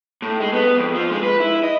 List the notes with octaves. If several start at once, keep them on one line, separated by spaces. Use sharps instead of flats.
A2
G#3
B3
F2
F3
G#3
B4
E4
D#5